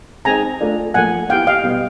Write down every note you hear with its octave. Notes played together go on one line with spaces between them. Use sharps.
G#3 C4 D#4 G#5 A#5
A3 D4 F4
A#2 F3 A3 F#5 G#5
B3 E4 G4 F5 G5
D#5 F5
B2 G3 B3